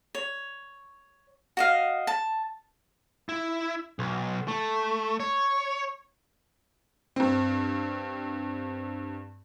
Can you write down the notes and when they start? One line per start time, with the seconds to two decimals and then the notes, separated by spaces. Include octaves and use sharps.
0.15 C#5
1.57 F#4 D#5 F5
2.07 A5
3.29 E4
3.99 B1
4.48 A3
5.20 C#5
7.16 G2 C4